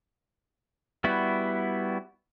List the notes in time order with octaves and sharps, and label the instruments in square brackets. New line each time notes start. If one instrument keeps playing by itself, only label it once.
[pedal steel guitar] G3 B3 E4 F#4